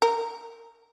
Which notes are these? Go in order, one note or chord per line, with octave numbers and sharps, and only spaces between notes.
A#4